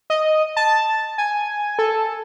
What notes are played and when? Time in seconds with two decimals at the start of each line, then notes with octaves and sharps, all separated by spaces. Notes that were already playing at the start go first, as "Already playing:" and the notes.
0.10 D#5
0.57 A5
1.18 G#5
1.79 A4